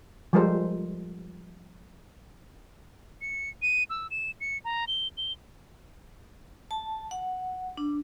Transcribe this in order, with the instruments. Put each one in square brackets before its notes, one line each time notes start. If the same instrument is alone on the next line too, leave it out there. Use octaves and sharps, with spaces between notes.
[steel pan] F3 G3 G#3 A4 A#4 C5
[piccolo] C#7
D#7
E6
E7
C#7
A#5
G7
G7
[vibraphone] A5
F#5
D4